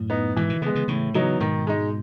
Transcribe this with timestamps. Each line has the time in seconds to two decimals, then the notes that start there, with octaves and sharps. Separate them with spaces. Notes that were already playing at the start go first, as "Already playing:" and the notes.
Already playing: F#2 A2
0.10 B3 D#4
0.36 G#2 B2 E3
0.49 B2 D#3
0.62 C#3 E3 G#3 B3
0.75 C#3 E3
0.88 A2 C#3 E3
1.14 C#3 E3 F#3 B3 D#4
1.40 G#2 B2 D#3
1.67 G#3 D#4